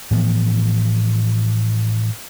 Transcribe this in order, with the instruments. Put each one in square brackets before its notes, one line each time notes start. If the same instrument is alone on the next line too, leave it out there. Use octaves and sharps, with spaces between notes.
[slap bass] A2 E3 F3 B3